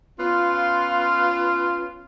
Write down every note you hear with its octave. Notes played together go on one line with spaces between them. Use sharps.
B3 C#4 F4